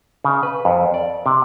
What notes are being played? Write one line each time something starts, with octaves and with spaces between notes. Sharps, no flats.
C#3
B4
F2
D5
C3